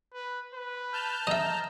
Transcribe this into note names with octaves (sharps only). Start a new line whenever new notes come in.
B4
B4
A5 F6 G6
D#5 E5 A#5